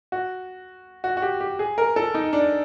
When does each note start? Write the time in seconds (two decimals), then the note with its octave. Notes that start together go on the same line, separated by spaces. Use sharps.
0.12 F#4
1.04 F#4
1.17 F#4
1.22 G4
1.41 G4
1.59 G#4
1.78 A#4
1.96 A4
2.14 D#4
2.33 D4